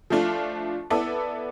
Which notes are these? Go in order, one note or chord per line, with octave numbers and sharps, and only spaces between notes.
F3 A3 D4 F4
B3 E4 A4 D5